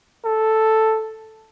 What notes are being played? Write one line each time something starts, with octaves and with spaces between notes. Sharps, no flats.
A4